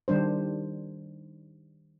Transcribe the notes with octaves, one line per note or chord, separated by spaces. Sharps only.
D#3 G3 D4 C5